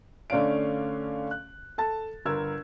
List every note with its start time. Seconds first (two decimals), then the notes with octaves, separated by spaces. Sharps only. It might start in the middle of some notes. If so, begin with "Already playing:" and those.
0.30 D3 A3 C#4 D4 F5 D7
1.31 F#6
1.78 A4 A5 A6
2.26 G1 A#4 E6 G#6